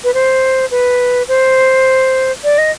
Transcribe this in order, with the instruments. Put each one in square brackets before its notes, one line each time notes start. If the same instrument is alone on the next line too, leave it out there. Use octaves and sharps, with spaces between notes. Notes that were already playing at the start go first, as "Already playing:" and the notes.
[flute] B4
C5
B4
C5
D5
D#5